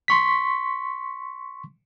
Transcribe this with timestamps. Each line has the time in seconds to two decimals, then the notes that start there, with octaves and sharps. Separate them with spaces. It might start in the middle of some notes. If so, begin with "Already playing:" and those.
0.08 C6 C#6 B6